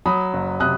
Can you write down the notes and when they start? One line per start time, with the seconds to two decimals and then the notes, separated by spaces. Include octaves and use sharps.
0.06 F#3 B5 D#6
0.33 F#1
0.60 C3 D#6 F#6